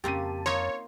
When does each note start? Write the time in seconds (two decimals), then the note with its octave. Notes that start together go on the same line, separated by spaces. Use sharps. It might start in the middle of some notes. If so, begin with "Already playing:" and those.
0.04 F2 C#3 A#3 C4 G4 A5 D#7
0.46 A#3 D#4 F4 C#5 C6